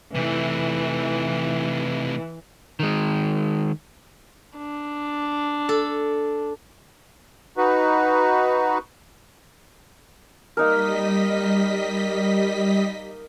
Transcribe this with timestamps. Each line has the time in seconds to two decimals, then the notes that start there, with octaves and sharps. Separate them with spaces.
0.15 C3 E3 A3
2.80 D#3 G#3
4.57 D4
5.69 A4
7.57 D#4 F#4 B4
10.57 G3 A#3 D#4 A#4 D#5 B6